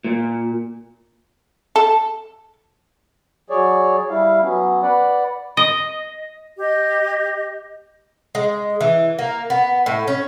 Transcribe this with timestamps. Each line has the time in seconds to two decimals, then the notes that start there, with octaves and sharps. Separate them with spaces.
0.05 A#2
1.76 A4
3.50 F#3 G#4 C#5 D5
4.10 G3 E4 F5
4.42 F#3 B3 C#4
4.83 B4 D5 F#5
5.57 D#5
6.59 G4 D#5
8.35 G#3
8.81 E3
9.19 A#3
9.50 B3
9.86 A2
10.08 C#4